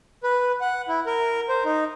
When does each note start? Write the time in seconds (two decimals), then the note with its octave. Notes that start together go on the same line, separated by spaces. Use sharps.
0.23 B4
0.61 F#5
0.88 E4
1.06 A#4
1.49 C5
1.65 D#4